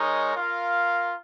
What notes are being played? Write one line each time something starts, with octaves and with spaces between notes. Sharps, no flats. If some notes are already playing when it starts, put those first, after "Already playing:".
Already playing: G#3 D#4 A#4 C#5
F4 A#4 F5